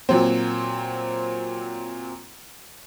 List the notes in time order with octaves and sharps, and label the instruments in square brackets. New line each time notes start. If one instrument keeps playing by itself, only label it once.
[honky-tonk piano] A#2 F#3 C4